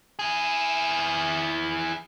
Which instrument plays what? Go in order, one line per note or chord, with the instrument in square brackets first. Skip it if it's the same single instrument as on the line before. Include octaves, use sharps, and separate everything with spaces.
[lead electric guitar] E4 G#4